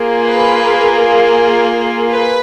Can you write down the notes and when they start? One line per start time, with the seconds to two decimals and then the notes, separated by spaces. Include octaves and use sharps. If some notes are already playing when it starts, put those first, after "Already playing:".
Already playing: A#3 F4 G#4
0.26 B4
2.10 B4